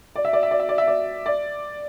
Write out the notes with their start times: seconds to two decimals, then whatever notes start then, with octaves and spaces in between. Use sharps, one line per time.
0.16 D5
0.25 E5
0.33 D5
0.43 E5
0.51 D5
0.60 E5
0.69 D5
0.78 E5
0.87 D5
1.26 D5